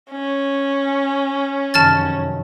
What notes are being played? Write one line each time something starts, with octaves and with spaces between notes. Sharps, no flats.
C#4
F1 F#2 D#3 A5 F6 A6